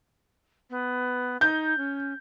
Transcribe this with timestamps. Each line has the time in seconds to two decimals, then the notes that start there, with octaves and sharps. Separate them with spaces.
0.70 B3
1.41 D#4 G6
1.77 C#4